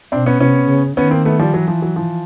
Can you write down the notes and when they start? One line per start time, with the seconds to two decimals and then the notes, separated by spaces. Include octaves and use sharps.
0.12 B2 C4 D4
0.26 B3 C#4
0.40 C3 B3 C#4
0.68 C#3
0.97 D#3 B3 C#4
1.11 A#3 C4
1.25 A3 B3
1.39 F3 G3
1.54 E3 F#3
1.68 F3
1.82 F#3
1.96 F3